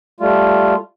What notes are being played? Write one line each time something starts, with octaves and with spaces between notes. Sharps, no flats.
G3 A3 F4